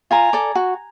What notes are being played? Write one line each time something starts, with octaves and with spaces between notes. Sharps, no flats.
F4 G#5 A#5
A4 D5
F#4